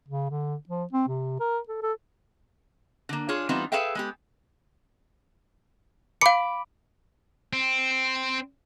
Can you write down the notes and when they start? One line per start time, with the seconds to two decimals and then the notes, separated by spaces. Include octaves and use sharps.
0.09 C#3
0.31 D3
0.69 F3
0.93 C4
1.08 C3
1.40 A#4
1.68 A4
1.82 A4
3.09 D3 A#3
3.29 D4 F4 G#4 C#5
3.49 E3 G3 B3 C4 D#4 F4
3.72 G#4 A4 B4 E5 F5 G5
3.95 G#3 B3 G4
6.21 F5 B5 D6 C#7
7.53 C4